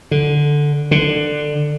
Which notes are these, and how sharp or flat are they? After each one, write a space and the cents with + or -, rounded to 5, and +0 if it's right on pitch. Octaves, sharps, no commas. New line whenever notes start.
D3 +0
D3 +15